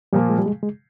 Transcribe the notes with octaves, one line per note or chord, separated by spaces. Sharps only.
A#2 F3 G3 A#3
G#3
G3
G#3
G#3